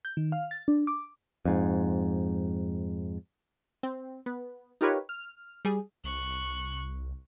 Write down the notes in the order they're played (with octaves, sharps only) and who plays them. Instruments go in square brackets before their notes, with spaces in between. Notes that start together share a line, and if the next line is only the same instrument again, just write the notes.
[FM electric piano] G6
D#3
F5
A6
D4
D6
[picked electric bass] F2 G#2
[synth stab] C4
B3
D#4 F4 G4 A#4 B4 C#5
F6
G3 G#4
[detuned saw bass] C2 [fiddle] C#6 F#6